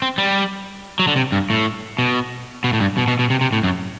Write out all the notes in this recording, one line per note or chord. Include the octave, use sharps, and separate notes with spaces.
C4
G3
F#3
D3
C3
G2
A2
B2
B2
A2
G2
B2
B2
B2
C3
C3
A2
F#2